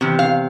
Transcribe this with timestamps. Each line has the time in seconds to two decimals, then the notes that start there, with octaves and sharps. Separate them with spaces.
0.01 E2 C3
0.19 F5